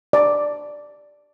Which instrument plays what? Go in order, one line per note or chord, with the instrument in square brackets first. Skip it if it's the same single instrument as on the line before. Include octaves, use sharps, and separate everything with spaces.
[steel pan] D5